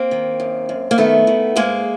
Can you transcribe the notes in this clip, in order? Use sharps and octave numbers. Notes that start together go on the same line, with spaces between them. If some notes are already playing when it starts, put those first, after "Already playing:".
Already playing: A#3 C4
D#3
F#2
F#2
A#3
D#3 A3 B3
D#3
G#2 G#3 A#3